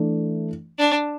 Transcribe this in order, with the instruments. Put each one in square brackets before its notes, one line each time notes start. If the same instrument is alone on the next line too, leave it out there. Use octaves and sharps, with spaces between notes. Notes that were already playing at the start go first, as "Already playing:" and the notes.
Already playing: [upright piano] E3 A3 D4
[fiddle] D4